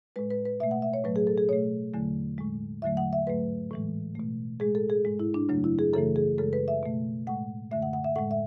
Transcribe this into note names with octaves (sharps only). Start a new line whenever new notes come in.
A2 G#3 B4
B4
B4
B2 A3 E5
F#5
E5
C#5
A2 F#3 A3 B4
G#4
A4
G#4
B2 A3 C#5
E2 D3 F#3 A3
A2 G#3
E2 D3 F#3 A3 E5
F#5
E5
G#2 F#3 A3 B4
A2 E3 G#3
B2 A3
A2 G#3 G#4
A4
G#4
G#2 G#3
E4
D4
F#2 C#3 F#3 A3 D4
E4
G#4
F#2 C#3 E3 A3 A4
G#4
F#2 C#3 G#3 A4
B4
E5
B2 A3
A2 G#3 F#5
F#2 D3 A3 E5
F#5
F#5
E5
A2 G#3 F#5
E5